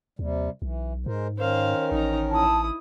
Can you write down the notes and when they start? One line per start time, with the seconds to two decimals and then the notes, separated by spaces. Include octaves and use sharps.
0.19 D#2 C3 G3
0.62 B1 E3
1.06 G#2 G#3 A#4 C5
1.38 D#3 C#4 A#4 C5 F5
1.92 A1 D#4 A#5
2.30 E4 A5 D#6